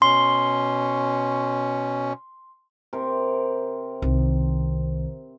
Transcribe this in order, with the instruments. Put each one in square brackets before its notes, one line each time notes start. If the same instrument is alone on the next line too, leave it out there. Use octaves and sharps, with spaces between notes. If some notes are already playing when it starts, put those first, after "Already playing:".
[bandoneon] B2 C#4 [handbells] C6
[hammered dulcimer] C3 A#4
[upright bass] C2 D#3